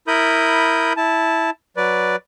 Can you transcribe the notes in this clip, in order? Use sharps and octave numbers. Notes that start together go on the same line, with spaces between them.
E4 A#4 B5 D#6 G6
E4 A5
F#3 B4 D5